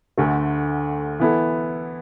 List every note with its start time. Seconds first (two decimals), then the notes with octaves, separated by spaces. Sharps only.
0.18 D2 D3 A3
1.20 E3 B3 E4 A4